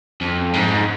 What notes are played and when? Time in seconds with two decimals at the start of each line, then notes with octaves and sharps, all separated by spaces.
0.21 F2
0.53 G#2